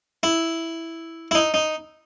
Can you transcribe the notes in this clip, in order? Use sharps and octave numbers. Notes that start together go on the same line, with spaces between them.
E4
E4
D#4
D#4